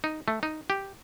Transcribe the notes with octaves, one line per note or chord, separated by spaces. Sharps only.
D#4
A3
D#4
G4